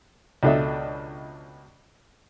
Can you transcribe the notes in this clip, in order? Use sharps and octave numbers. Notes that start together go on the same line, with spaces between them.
C#2 B2 D4 A4 D#5 E5